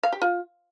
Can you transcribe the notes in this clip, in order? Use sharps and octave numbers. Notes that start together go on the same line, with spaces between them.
F5
G4
F4